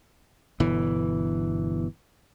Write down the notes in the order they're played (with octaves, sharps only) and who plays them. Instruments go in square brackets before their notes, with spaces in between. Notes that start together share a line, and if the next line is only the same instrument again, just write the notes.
[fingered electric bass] G1 B2 E3